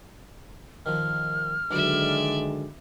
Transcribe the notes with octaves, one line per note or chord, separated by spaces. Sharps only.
D#3 F3 F6
C#2 D3 D#3 F#3 G#3 D5 E5